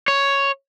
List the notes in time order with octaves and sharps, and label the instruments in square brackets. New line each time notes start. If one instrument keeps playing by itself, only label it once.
[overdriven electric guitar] C#5